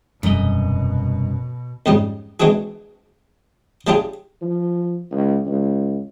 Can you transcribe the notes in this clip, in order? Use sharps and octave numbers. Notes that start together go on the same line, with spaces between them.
E1 C2 F#2 B2 G3 C4 D#5
F2 G#2 C#3 G3
E3 G#3 C4 D4 F#4 G#4
F#3 A3 D4 F4 G4 G#4
F3
C#2
C#2